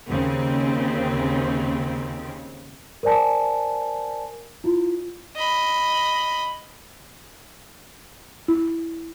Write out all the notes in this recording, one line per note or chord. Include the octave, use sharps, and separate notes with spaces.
D#2 C#3 C4
A#4 C5 D5 G#5 A5
E4 F4
D#5 B5
E4